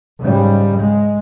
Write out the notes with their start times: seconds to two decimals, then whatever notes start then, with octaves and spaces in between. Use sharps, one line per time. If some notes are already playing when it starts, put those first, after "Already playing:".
0.20 G#2 C#3 G3
0.77 G#3